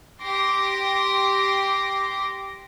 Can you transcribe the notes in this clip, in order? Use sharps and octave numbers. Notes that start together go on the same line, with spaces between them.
G4 C6 D6 A#6